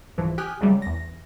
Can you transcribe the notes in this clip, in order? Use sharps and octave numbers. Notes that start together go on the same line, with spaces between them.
C2 G#2 E3 F3
G4 G5 G#5 D#6 F6 F#6
C#2 C#3 F#3 G3 A3
E2 A#6